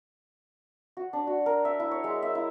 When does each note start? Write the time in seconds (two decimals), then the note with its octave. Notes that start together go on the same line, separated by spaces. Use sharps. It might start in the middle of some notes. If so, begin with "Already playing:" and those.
0.97 F#4
1.13 D4
1.27 F#4
1.46 A#4
1.65 E5
1.80 E4
1.91 C#5
2.04 G#3
2.22 E5
2.35 E4